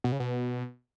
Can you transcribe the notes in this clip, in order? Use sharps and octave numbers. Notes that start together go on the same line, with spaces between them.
B2
C#3
B2